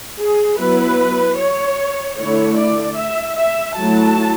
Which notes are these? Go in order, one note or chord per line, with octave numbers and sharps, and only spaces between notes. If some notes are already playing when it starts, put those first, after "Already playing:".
G#4
F#3 B3 E4 B4
C#5
D3 A3 E4 C#5
D5
E5
E5
F#3 A3 E4 A5